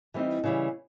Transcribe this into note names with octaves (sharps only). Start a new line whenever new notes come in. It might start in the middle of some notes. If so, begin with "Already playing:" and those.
E3 G3 C4 D#4
C#3 E3 G3